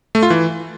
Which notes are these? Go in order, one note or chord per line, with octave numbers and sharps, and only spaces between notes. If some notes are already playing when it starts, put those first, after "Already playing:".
A3
F4
E3